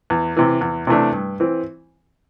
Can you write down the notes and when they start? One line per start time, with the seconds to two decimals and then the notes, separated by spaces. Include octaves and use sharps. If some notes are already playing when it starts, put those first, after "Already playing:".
0.10 E2
0.37 C3 E3
0.61 E2
0.87 C3 E3 A3 D4
1.13 G2
1.40 E3 C4